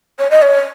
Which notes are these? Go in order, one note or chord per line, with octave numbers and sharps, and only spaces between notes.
C#5
D#5
C#5